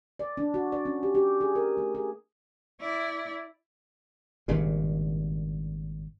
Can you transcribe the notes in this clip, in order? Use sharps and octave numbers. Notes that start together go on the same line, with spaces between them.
D5
D4
F#4
D5
C#4
G4
G4
G#4
A#4
A3
G#4
E4 D5
G#1 G2 A#2 C#3